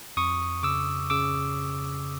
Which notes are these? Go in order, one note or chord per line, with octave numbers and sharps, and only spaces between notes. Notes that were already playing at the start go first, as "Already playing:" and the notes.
F2 C#6 D#6
C#3 D6 E6
C#3 D6 E6